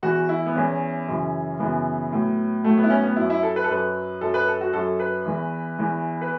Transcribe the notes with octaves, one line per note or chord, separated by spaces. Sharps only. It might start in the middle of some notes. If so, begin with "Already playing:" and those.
E2 E3 F#4
E4
B3
E2 E3 C#4
F#2 C#3 E3
F#2 C#3 E3 B3
A2 F#3
A2 F#3 A3
B3
E4
C#4
B3
F#2 F#3 E4
E4
A4
B4
A4
F#2 F#3 B4
F#2 F#3 A4
B4
A4
F#4
F#2 F#3 A4
B4
E2 E3
E2 E3
B4